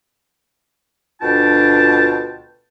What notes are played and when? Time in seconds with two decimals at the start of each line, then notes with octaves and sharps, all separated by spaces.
1.21 D2 B2 D4 F4 G5 A5